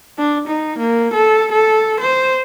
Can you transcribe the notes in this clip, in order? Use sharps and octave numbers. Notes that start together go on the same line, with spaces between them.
D4
D#4
A#3
A4
A4
C5